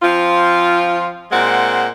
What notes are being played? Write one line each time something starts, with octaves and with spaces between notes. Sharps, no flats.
F3 C4 F4
A#2 G#3 C4 F#5